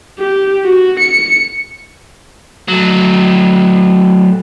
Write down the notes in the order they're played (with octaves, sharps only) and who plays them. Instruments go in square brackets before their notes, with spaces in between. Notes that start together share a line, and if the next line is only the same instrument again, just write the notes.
[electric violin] G4
F#4
C#7
[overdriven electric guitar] F#3 A3